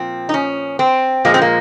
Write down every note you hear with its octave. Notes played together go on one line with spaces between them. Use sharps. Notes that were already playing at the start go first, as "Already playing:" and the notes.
Already playing: A#2 F3 C4
D#4
C#4
C4
A#2 F3 G#3 A#3
C4
A#3